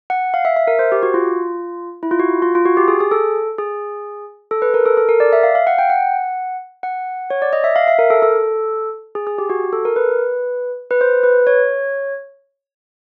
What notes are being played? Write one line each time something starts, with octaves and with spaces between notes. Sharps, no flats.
F#5
F5
E5
E5
A#4
C5
G4
F#4
F4
E4
F4
F#4
F4
F4
F#4
G4
G#4
G#4
A4
G#4
A4
B4
A#4
A4
A4
A#4
D5
E5
F5
F5
F#5
G5
F#5
F#5
C#5
D5
D#5
E5
F5
E5
A#4
A4
A4
G#4
G#4
G4
F#4
A4
A#4
B4
B4
C5
B4
C#5